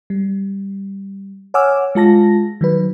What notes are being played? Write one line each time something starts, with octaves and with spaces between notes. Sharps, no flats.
G3
C#5 F#5 G#5 D6 E6 F6
G#3 F4 A5 A#6
D#3 F#3 B4